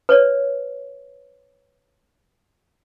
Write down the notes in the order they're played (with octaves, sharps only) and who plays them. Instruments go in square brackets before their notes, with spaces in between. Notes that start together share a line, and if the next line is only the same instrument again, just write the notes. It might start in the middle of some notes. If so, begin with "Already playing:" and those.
[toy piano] B4 C#5 D5